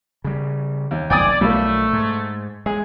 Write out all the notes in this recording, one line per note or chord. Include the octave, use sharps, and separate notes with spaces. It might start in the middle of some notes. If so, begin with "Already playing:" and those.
C#3 G3
D#2
F1 B1 D5 G5 G#5 D#6
B1 F3 G3 A3 A#3
G#2
G#3 G#4